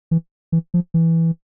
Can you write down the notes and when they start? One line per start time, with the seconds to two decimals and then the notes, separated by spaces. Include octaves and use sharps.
0.11 E3
0.52 E3
0.74 F3
0.94 E3